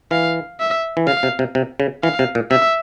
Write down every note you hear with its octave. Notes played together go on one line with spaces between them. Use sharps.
E3 F5
E5
E3
C#3 F5
C3
C3
C3
C#3
E3 F5
C3
A#2
C3 E5